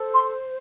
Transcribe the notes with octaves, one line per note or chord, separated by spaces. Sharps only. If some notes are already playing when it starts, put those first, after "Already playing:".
Already playing: A4 C5
C6